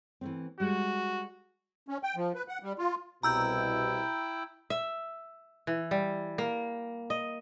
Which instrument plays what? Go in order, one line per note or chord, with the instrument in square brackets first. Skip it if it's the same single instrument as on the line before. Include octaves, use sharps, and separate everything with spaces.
[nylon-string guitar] E3 A3 C4
[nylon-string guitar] G3 G#3 [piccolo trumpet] F#4
[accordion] C#4
G5
F3
B4
F#5
G3
F4
[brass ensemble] C2 B2 [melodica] E4 G5 [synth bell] A#5 E6 G6
[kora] E5
E3
G3
A#3
D#5